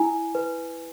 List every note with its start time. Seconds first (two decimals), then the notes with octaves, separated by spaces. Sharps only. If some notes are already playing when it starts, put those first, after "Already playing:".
Already playing: E4 G#5
0.35 B4